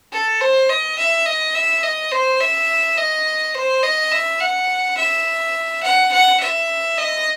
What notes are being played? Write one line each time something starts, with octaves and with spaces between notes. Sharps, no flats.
A4
C5
D#5
E5
D#5
E5
D#5
C5
E5
D#5
C5
D#5
E5
F#5
E5
F#5
F#5
E5
D#5